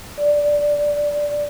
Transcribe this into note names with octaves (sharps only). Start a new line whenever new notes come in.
D5